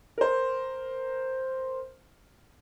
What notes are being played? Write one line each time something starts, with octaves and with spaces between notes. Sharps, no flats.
A#4 C5